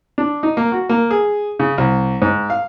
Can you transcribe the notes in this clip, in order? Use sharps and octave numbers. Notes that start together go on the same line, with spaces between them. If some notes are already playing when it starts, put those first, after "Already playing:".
D4
D#4
A#3
F#4
A#3
G#4
C#3
C2
G#2
F5